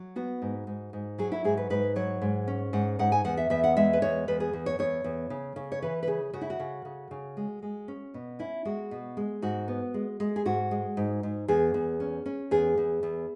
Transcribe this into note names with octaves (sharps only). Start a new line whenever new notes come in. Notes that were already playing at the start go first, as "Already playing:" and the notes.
Already playing: F#3
B3 F#4
G#2
G#2
G#2
F#3 G#4
E4
G#2 G#4
B4
G#2 B4
F#3 C#5
G#2
C#4
G#2 F#5
G#2 F#5
G#5
E2 F#5
E5
E2 E5
F#5
G#3 E5
B4
E2 C#5
E2 B4
G#4
E2
C#5
E2 C#5
E2
C#3
C#3
C#5
E3 B4
B4
C#3 G#4
C#3 F#4
E4
F#4
C#3
C#3
C#3
G#3
G#3
C#4
B2
C#4 E4
G#3 F#4
B2
G#3
G#2 F#4
B3
G#3
G#3
G#4
G#2 F#4
G#3
G#2
G#2
E2 G#4
E2
C#4
C#4
E2 G#4
E2
E2